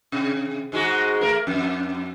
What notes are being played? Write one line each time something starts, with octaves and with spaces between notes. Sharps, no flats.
C3
G#2 G#3 F#4
A3 A#4
F2